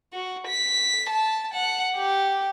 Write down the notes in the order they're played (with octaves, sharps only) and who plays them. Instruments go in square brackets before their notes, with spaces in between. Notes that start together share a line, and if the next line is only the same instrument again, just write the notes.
[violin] F#4
B6
A5
F#5
G4